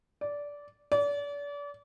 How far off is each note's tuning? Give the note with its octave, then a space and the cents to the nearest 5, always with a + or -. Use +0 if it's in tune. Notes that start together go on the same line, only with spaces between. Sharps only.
D5 -15
D5 -35